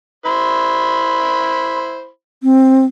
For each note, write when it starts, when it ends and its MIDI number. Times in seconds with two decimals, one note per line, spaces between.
0.26 2.08 64
0.26 2.08 72
0.26 2.08 83
2.43 2.85 60